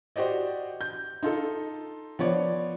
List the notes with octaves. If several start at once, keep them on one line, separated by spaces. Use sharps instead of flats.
F#4 G4 C5 D5 D#5
G6
D#4 F4 A4
F3 B3 C#5 D5